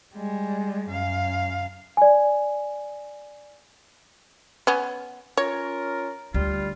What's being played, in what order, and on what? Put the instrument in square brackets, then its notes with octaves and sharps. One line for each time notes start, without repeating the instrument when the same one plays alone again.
[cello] G3 G#3
F#2 F5
[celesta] D5 G#5
[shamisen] B3 C#4
[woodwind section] C#4 F4 A#4 [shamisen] C#5
[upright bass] D2 [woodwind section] G3 F4